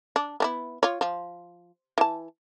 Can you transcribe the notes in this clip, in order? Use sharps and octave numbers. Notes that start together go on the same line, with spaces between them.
D4
B3 D4 E4
F4 C#5
F3
E3 A5